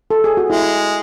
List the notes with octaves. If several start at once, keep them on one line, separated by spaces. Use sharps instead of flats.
A4
G#4
F#4
G#3 E4